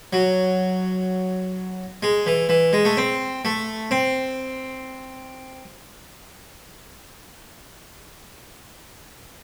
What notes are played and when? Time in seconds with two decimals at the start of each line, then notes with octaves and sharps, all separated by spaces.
0.13 F#3
2.03 G#3
2.26 E3
2.49 E3
2.73 G#3
2.85 A3
2.97 C4
3.45 A3
3.91 C4